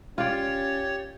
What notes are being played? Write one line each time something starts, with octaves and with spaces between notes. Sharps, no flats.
C#4 F4 G4 C#5 D5 A6